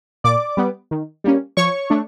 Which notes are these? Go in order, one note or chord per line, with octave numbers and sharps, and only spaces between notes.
A#2 D5 D6
G3 B3
D#3
G3 A#3 C#4
F3 C#5 C#6
A3 D4